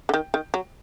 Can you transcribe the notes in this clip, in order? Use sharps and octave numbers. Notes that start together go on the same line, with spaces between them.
D3
D#3
D#3
F#3